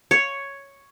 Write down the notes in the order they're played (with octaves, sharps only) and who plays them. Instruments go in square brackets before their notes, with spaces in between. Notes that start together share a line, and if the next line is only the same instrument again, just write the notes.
[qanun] C#5